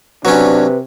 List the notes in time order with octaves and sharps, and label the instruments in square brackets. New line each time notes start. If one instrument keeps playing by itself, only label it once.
[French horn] C3 [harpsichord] F#3 C#4 [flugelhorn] D4 [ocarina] B4